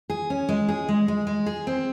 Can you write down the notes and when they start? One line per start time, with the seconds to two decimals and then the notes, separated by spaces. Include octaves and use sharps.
0.10 G#4
0.30 C#4
0.49 G#3
0.69 G#4
0.89 G#3
1.08 G#3
1.27 G#3
1.46 G#4
1.67 C4